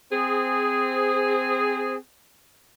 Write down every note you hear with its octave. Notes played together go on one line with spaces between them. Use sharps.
C4 G#4